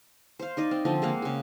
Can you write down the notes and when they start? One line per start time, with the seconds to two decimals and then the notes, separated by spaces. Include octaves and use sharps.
0.39 C5 F5
0.57 D#4 D5 D#5
0.71 C4
0.85 D3 F3 C4
1.02 G#3 A#3 F5 F#5
1.22 C#3 G#4